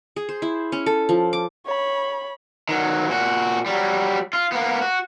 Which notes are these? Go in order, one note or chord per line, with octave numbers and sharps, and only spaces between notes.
G#4
C5
E4
C#4
A4
F3
D6
C#5 B5
D#3 F#3
A#2 F#4
F#3 G3
F4
A#3 B3
F#4